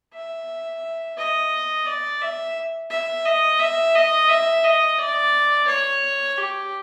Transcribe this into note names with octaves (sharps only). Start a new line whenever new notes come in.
E5
D#5
D5
E5
E5
D#5
E5
D#5
E5
D#5
D5
C#5
G4